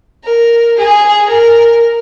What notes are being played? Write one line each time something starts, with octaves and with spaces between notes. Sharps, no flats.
A#4
G#4
A#4